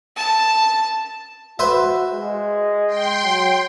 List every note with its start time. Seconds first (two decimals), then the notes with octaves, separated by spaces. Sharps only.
0.16 A5
1.59 F#4 B4 C5 E5
2.13 G#3
2.87 G5 C6
3.23 F#3